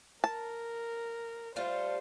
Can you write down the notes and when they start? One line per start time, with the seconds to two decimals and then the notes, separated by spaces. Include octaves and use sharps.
0.24 A#4 A5
1.56 G3 A3 F4 C5